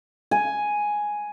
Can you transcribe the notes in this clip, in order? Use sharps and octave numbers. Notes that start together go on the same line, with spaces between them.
G#5